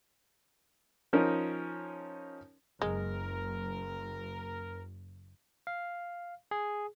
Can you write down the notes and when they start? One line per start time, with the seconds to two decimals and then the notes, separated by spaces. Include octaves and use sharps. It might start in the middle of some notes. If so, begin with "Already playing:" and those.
1.13 F3 C#4 D#4 A#4
2.82 F#1 G#3 A#4
5.67 F5
6.51 G#4